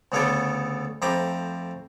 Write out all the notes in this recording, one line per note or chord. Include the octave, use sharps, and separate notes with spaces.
D2 C#3 B3 A4 C#5 D6
F2 A3 C5 A#5 B5 D6